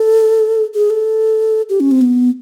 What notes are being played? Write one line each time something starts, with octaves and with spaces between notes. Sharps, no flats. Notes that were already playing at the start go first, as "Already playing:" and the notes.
Already playing: A4
G#4
A4
G4
C#4
C4
B3